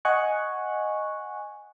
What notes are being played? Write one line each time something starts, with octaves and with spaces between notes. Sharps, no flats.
D#5 F#5 G#5 C#6 F#6